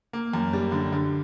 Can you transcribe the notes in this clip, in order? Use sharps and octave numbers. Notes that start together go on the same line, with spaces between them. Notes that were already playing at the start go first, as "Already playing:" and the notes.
A#3
F#2
G3
D3
D3